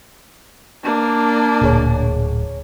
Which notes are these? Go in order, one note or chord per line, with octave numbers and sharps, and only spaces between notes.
A#3 D4
D1 D2 A#2 G#4 C#5